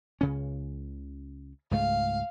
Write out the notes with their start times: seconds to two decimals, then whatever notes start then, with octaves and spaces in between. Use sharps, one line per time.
0.21 C#2 C#3 C#4
1.71 C#2 G#2 A3 F5